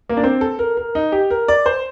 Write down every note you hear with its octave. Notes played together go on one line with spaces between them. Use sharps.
A#3
D4
C4
A4
A#4
A#4
D#4
G4
A#4
D5
C5